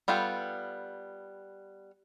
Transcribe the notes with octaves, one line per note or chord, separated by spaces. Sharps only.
G3 B3 F4 A4 G5